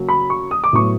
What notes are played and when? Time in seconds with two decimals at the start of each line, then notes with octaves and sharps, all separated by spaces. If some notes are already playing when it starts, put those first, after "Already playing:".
Already playing: C#3 F#3 A#3 C#4
0.09 B5
0.30 C#6
0.51 D#6
0.64 D6
0.73 A2 F#3 B3 C#6